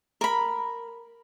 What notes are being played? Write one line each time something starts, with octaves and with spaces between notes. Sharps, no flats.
A#4 B5